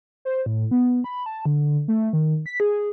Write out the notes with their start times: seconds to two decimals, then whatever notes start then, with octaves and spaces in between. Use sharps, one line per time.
0.25 C5
0.46 A2
0.71 B3
1.04 B5
1.26 A5
1.46 D3
1.88 A3
2.13 D#3
2.46 B6
2.60 G#4